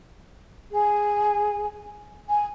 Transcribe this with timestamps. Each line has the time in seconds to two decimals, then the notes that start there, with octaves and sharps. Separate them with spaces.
0.73 G#4 G#5
2.29 G#5